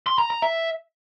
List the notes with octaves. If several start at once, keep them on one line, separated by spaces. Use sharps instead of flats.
C6
A#5
A#5
E5